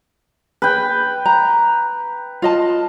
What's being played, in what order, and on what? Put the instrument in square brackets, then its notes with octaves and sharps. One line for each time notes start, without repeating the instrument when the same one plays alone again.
[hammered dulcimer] B4 G5
[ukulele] A#5
F4 D#5 A5